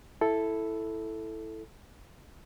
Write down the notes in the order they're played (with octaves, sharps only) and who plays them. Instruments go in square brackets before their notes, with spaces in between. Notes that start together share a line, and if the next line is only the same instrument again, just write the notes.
[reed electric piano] E4 A4